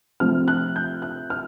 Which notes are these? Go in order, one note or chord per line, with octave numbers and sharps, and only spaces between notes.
C3 F3 A3 C4 F6
F#6
G6
F#6
F6